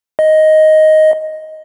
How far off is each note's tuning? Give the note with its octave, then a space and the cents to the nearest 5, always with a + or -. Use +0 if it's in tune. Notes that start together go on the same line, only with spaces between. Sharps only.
D#5 +5